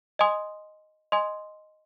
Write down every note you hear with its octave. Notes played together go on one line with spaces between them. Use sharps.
D#5 G#5 C6 D#6
D#5 G#5 C6 D#6